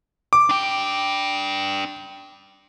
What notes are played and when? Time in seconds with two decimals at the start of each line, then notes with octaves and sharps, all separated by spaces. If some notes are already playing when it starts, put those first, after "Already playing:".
0.33 D6
0.49 D4 G5